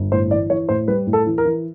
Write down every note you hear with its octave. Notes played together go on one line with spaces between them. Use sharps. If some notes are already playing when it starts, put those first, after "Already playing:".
Already playing: G1
A2 C5
E3 D5
E3 C#5
A2 C5
G3 B4
A2
A4
E3
A#4
E3